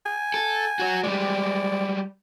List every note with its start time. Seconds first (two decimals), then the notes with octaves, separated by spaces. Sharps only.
0.06 G#5
0.34 A4
0.79 F#4 C#5
1.04 G3 G#3 D5